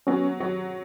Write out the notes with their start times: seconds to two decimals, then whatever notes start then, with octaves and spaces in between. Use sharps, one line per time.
0.07 F#3 B3 C#4
0.40 F#3